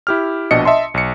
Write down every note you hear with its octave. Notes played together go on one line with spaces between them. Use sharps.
E4 G4 F6
A#1 B2 D4 D#5 C#7
D#5 E5 A5 C6
B1 C#7